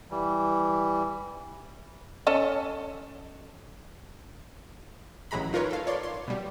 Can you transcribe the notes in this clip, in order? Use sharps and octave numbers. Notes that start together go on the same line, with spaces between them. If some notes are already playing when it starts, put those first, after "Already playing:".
E3 G3
C#4 A4 D#5
A1 A2 F#3 G#3 A#5 B5
D#4 F4 A#4 B4 C#5
A4 F5
C#5 D5 C6
C6
B2 G3